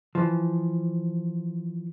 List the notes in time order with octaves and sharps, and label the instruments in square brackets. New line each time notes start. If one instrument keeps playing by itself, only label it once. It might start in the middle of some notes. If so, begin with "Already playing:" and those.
[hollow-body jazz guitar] E3 F3